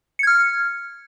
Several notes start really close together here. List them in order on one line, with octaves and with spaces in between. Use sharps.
C#7 G#6 F6